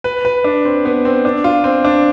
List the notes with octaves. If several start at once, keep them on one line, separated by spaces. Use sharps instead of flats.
B4
B4
D4
C4
B3
C4
D4
F4
C4
D4